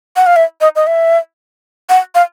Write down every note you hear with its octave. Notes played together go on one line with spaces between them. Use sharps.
F#5
F5
E5
D#5
D#5
E5
F#5
F5